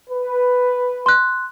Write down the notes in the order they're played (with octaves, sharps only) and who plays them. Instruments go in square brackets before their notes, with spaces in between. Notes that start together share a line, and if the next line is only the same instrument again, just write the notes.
[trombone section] B4
[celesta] C6 F#6